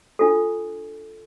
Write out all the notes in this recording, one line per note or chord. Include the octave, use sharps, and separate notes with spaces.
D4 F4 A4